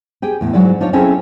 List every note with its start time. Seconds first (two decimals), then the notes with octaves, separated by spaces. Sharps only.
0.22 G4 G#4 G5
0.41 E2 A2
0.53 G#2 F#3 G#3 E4 D5
0.80 D4 D#4 F4 C#5
0.93 C4 C#4 E4 G#4 A4